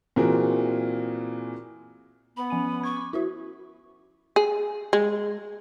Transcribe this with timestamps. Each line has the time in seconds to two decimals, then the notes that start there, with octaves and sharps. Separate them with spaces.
0.16 A#2 E3 C4 F#4 G#4 A#4
2.37 B3 B5
2.50 F3 C#4 G#5 D#7
2.83 C#6 G#6
2.97 D6
3.13 E4 F#4 E5
4.36 G#4
4.93 G#3